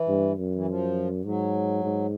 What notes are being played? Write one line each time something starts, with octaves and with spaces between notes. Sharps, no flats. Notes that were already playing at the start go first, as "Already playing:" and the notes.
Already playing: E3
G2
F#2
E3
F3
G#2 F#3
G#2